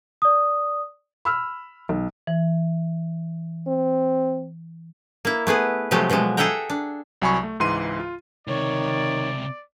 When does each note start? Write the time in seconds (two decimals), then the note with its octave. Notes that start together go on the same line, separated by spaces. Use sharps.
0.22 D5 D#6
1.25 B5 E6 F6
1.89 B1
2.27 E3
3.67 C4
5.25 A#3 E4
5.47 A3 B3 G#4 B4
5.91 C3 F3 F#3 G#3 A3 G4
6.10 B2 F3 F#3 G#3
6.37 G#4 A4 E5 F#5 G5 A#5
6.70 D4
7.22 C2 F#3 G#5 B5 C#6
7.43 A3
7.60 C#2 G#2 E3 C6 D#7
8.00 F4
8.48 C#2 C3 D#3 C#5 D5